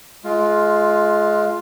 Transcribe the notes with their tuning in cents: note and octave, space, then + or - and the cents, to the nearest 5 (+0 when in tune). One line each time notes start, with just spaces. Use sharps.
G#3 +30 F4 +0